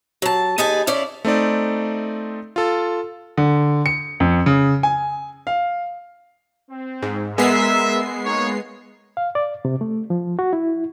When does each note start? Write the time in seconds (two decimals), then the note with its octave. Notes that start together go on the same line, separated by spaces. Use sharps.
0.22 F#3 A5
0.58 D#2 D#4 G#4 B4 G#5 A5
0.87 C#4 E4 D5 F5
1.25 A3 C4 D#4 D5
2.56 F4 A4
3.38 D3
3.86 C#7
4.20 F2
4.46 C#3
4.83 G#5
5.47 F5
6.71 C4
7.02 G#2
7.38 G#3 B3 A#4 E5 C7
8.25 A#3 D#4 C#5
9.17 F5
9.35 D5
9.65 C3
9.81 A3
10.10 F3
10.39 F#4
10.53 E4